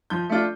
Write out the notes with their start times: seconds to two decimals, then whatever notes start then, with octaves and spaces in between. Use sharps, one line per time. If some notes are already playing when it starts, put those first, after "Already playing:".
0.10 F3 G6
0.29 A3 D4 F4